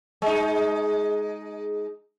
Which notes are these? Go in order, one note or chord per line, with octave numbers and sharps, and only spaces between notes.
G#3 D#4